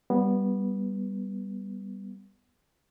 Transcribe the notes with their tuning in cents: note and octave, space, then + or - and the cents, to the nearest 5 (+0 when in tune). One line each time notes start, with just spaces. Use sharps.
G3 +0 B3 -10